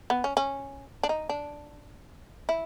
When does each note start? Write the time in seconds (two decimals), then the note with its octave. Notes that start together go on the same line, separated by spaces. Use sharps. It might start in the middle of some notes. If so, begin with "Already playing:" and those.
0.10 B3
0.24 C#4
0.37 C#4
1.03 D4
1.09 D#4
1.29 D4
2.49 E4